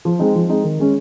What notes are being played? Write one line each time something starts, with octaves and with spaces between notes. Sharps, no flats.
F3
G#3 C4 D#4
F3
G#3 C4 D#4
D#3
G#3 C#4